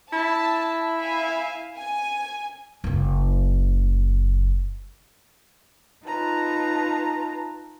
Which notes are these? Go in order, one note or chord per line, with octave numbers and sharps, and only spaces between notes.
E4 A5
E5 F5 G#5
G#5
F#1 C#3
D#4 F4 B4 A5 A#5